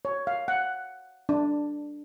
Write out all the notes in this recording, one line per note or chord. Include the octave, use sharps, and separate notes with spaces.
C#5
F5
F#5
D4